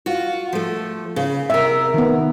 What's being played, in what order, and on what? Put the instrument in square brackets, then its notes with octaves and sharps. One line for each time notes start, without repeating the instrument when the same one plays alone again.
[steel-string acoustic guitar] F4 F#4
F3 A3
C#3
[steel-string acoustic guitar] C3 A#4 [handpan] E5
[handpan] D#3 B3